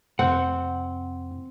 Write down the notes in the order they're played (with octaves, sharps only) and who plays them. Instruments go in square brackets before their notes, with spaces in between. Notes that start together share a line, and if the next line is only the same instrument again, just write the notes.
[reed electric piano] F2 C3 [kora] C4 [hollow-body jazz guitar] F#5